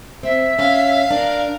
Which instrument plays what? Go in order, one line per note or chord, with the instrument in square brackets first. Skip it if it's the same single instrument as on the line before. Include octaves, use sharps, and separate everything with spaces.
[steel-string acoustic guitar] C4 [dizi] E5
[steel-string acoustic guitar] C#4 [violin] F5
[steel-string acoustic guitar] D4 [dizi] A#4